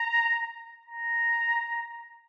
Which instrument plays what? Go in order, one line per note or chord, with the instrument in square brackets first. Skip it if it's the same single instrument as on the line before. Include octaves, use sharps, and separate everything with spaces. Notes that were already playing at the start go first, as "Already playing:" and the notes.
Already playing: [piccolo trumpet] A#5
A#5